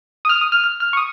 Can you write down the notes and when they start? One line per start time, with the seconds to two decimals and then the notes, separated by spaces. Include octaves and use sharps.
0.25 D#6
0.29 F6
0.41 D#6
0.52 F6
0.64 F6
0.80 F6
0.93 C#6
0.97 D#6